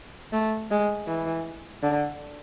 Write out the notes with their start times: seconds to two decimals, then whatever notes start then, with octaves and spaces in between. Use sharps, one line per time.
0.33 A3
0.71 G#3
1.08 E3
1.83 D3